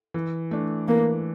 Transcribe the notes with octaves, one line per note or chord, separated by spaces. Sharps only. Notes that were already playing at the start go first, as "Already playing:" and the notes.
E3
A3 D4
E3 A#3